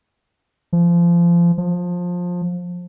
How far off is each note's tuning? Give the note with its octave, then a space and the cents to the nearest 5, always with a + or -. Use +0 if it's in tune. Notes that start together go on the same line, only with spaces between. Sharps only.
F3 -25
F3 +20